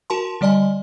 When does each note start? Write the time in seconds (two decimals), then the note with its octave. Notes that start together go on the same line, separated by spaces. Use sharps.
0.10 F#4 A#4 A5 C6
0.41 D3 G3 D5 D#5 G#5